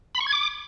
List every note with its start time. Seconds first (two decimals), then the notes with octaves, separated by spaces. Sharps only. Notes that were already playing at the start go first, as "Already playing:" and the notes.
0.15 B5
0.21 C#6
0.26 G#6
0.32 D6